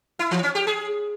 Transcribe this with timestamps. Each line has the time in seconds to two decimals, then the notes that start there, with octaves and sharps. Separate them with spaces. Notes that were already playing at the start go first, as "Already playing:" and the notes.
0.19 E4
0.31 E3
0.43 C#4
0.55 G4
0.67 G#4